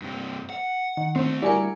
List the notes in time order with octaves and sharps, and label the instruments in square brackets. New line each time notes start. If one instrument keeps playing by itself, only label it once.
[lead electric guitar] G2 C3
F#5
[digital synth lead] D#3
[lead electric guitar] D3 A3 [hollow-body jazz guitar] C4
[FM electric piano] G3 G#5 C#7 [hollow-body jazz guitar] E4 F#4 A#4 [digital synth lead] D5